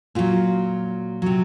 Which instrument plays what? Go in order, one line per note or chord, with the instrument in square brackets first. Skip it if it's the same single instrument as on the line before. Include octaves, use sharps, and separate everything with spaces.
[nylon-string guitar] A#2 F#3 F4
C3 F#3